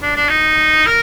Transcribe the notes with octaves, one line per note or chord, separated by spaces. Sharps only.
D4
D4
D#4
A#4